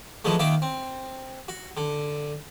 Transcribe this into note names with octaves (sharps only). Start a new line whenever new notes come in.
E3 F3 G#3 A3
D#3 A#3 E5 D6
C4
F#4
D3